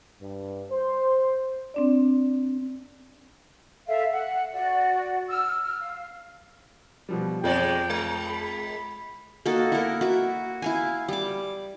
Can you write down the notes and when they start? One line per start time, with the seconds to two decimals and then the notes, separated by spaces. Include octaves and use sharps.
0.21 G2
0.71 C5
1.74 C4 D4 D5
3.87 A4 E5 F5
4.12 F#5
4.53 F#4 D5 F#5
5.29 E6 F6
5.64 F6
5.80 F5
7.09 B2 F3 G3
7.44 F2 G#3 C4 D5 G5
7.90 G#3
8.27 B5
9.46 A#3 D#4 F#4 A4
9.72 E4 A#4
10.01 F#4 E5
10.62 E4 F5 G#5
11.08 G3 D6